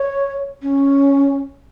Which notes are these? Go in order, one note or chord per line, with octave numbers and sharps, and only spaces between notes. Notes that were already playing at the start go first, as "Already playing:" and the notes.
Already playing: C#5
C#4